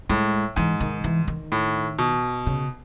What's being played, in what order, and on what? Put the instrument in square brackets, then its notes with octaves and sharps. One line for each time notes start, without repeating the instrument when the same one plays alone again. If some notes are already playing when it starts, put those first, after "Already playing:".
[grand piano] A2 [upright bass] G#3
[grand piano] G#2 [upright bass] E3
[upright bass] D#3
E3
D#3
[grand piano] A2
B2
[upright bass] C#3